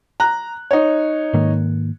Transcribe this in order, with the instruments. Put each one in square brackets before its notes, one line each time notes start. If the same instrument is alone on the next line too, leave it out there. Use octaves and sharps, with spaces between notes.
[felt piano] A#5 F#6
D#4 C#5
[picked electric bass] G#2 D#3 A#3